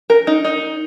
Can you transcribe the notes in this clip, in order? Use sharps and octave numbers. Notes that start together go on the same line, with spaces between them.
A#4
D#4
D#4